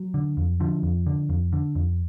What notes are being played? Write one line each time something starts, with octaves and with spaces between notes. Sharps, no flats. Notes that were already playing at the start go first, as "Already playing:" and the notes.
Already playing: F#3
D3
F2
D3 F3
F2
D3
F2
D3
F2